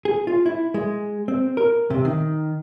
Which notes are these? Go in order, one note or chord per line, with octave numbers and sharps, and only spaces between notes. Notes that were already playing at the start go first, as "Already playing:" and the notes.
G#4
F4
E4
G#3
C4
A#4
C3
D#3